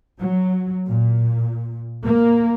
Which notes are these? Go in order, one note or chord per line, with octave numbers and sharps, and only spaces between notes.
F#3
A#2
A#3